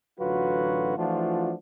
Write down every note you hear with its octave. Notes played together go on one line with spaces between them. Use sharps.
A1 D3 F#3 F4 F#4 B4
E3 F3 A3 D4 F4 F#4